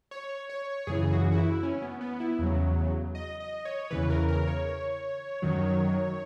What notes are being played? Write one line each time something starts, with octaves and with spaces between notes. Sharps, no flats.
C#5
C#5
F#2 C#3 E3 G#4
F#4
F#4
E4
C#4
B3
B3
E4
E2 C#3 F#3
D#5
D#5
C#5
E2 C#3 E3 B4
A#4
A#4
C#5
F#2 D#3 F#3